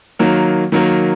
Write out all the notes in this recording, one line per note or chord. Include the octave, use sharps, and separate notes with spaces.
D#3 F#3 A#3
D#3 F#3 A#3